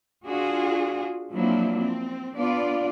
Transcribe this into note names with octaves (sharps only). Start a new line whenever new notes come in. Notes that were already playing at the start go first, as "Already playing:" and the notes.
D4 F4 F#4 G#4
F3 F#3 A#3 C4 D4 E4
C4
B3 D4 F4 D5